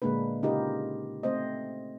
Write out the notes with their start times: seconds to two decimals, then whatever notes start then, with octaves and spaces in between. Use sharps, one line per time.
0.02 A#2 D3 G#3 A#3 D4 B4
0.43 C#3 D#4 F4 G4 A#4 D#5
1.23 A3 C4 C5 D#5